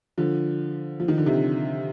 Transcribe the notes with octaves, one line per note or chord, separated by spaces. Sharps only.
D3 F3
F3
D#3
D3
C3 D#3